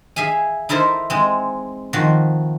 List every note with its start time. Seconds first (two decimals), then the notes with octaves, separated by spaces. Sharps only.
0.16 G#4 E5 F5 G#5
0.69 D#4 E4 A4 A#4 C5
1.10 G#3 C4
1.93 D#3 F3 F#4